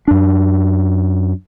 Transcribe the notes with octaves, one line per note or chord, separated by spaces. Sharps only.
F#2 D4